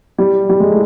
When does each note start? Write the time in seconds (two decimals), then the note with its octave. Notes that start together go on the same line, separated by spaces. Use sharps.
0.19 G3
0.49 G3
0.60 G#3
0.70 A3